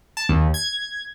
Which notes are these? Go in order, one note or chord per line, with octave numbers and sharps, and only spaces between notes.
A5
D#2
G#6